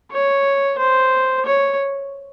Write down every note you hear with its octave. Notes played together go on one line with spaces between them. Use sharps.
C#5
C5
C#5